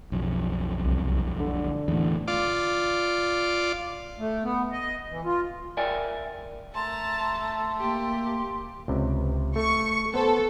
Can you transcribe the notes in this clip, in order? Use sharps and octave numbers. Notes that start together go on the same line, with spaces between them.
B1 F2
C2
D3
E2 A2
F4 D5
A3
B3
D#5
E3
F4
A#4 D5 E5 G5 G#5
A3 A5 A#5 C6
A#3 G4
C#2 C3
A3 C#6
B3 A4 C5